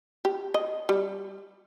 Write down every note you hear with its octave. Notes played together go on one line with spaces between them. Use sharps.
G4
D#5
G3